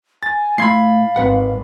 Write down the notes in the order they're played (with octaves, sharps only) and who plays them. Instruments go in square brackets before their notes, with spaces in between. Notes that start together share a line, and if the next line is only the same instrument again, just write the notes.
[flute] G#5 [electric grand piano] A6
[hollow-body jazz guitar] A2 C6 [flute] F5 [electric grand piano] B5 G#6 C7
[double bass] G#1 G#2 [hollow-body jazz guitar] C4 B4 F#5